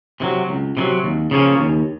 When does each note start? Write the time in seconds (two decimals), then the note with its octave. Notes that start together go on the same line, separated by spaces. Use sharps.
0.20 C3 D#3 F#3
0.49 C#2
0.77 C3 D#3 F#3
1.04 D#2
1.31 C#3 F3 A#3 C#4
1.59 D#2